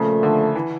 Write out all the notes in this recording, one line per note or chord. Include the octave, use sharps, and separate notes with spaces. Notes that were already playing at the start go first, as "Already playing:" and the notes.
Already playing: A#2 C#3 F3 A3
D3
E3